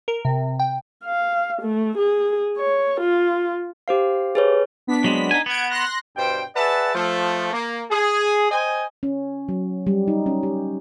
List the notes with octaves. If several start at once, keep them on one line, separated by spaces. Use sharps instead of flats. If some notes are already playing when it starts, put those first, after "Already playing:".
A#4
C3
G5
F5
A3
G#4
C#5
F4
G4 C5 F5
G#4 B4 C#5
B3 D4 B6
F#3 G#3 C4
D#4 G#5
B3 F#5 G#6 D7
C6 F#6 A#6
G2 B2 G3 C5 G5
G#4 B4 D5 E5 F#5 A5
F3 A3
A#3
G#4
C5 D#5 G5 G#5
C#4
F#3
G3
D#4
C#4
G4